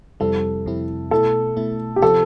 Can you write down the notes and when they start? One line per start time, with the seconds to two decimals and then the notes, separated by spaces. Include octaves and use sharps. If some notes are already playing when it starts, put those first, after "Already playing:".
0.20 F2 C3 G3 C4 E4 A4
0.66 F2 C3 G3 C4 E4
1.11 B2 A3 E4 A4
1.57 B2 A3 E4
1.96 G4
2.02 C3 F3 C4 F4 A4